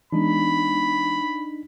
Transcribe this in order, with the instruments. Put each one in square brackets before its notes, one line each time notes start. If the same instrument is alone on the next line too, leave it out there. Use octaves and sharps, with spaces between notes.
[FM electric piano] E3 G#3 B3 [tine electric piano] D4 D#4 [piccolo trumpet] B5